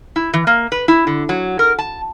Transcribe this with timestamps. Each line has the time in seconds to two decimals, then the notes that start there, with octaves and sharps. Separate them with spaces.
0.16 E4
0.34 E3
0.47 A#3
0.72 B4
0.88 E4
1.07 D3
1.29 F#3
1.59 A#4
1.78 A5